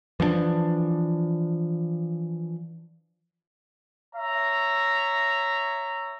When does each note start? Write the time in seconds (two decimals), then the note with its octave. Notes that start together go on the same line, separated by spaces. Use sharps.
0.20 E3 F3 B3 D4
4.15 C#5 E5 A#5